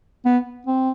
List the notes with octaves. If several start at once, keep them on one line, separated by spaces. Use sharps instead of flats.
B3
C4